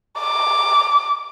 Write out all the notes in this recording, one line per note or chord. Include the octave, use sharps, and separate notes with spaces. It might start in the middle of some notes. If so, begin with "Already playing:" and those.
D6